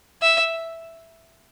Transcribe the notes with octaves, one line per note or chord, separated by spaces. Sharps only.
E5